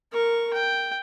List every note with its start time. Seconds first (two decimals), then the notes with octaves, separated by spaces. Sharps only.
0.12 A#4 C#6
0.54 G5